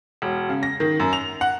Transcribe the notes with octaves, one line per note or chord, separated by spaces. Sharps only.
E1
C#3
A#6
D#3
F#2
F7
F#5